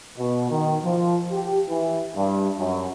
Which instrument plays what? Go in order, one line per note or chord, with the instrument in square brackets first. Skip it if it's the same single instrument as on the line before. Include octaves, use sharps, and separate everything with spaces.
[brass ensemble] B2
D#3
F3
G4
E3
G2
F#2